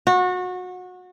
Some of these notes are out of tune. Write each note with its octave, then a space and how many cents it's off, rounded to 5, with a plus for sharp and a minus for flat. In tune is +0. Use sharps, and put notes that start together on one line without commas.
F#4 -25